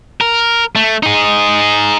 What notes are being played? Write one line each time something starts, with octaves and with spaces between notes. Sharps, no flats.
A#4
A3
D#4 G#4